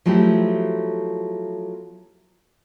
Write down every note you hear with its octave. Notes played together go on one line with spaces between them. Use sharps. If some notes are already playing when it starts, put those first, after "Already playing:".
F3 F#3 A3 B3 E4 G4